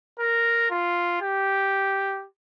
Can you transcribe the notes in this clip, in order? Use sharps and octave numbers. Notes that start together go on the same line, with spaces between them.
A#4
F4
G4